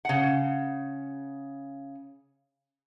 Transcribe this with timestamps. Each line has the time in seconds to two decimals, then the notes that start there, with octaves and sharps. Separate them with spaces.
0.05 C#3 F#5